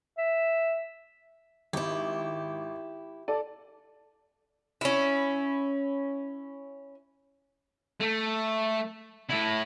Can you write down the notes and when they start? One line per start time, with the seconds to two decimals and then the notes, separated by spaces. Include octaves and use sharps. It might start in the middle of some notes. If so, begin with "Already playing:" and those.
0.18 E5
1.73 G#1 E4 G4
3.28 A4 D5
4.81 C#4 E4
8.00 A3
9.30 A2 E4